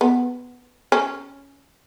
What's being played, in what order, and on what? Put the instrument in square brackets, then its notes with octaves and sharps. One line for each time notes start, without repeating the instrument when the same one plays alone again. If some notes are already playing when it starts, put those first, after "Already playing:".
[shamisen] B3
C#4